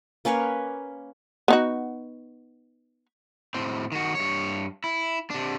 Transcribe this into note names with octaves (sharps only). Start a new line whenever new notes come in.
A#3 C#4 B4 C#5
B3 D#4 F#4
A2 C4
D#3 F#4
G2 C#5
E4
C3 D4